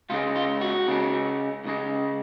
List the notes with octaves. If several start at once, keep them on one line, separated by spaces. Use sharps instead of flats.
C#2 C#3 G#3 F4
F4
F#4
C#2 C#3 G#3
C#2 C#3 G#3